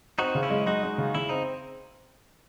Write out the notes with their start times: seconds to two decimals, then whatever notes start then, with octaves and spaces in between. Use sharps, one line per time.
0.19 C4 D#4 F#4
0.35 C#3
0.43 C#4 E4
0.50 G#3
0.66 G#3 D#4 F#4
0.83 G#3
0.98 C#3
1.15 C#3 E4
1.29 C4 D#4